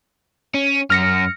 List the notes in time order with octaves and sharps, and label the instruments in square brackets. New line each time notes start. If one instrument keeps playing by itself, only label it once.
[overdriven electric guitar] C#4
[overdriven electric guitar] F#2 [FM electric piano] F6 A#6 C#7